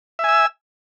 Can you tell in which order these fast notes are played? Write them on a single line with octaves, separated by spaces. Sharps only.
E5 G#5 E6